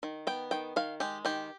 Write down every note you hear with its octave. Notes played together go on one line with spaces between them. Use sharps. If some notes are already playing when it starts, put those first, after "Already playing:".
D#3
B3 G5
D#3 G5
D#3 F5
G#3 G4
D#3 G4